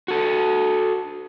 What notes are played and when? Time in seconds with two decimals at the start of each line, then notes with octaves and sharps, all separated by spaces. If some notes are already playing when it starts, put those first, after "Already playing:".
0.08 F#4 A4